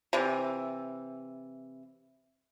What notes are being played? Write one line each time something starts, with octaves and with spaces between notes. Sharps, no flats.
C3 E3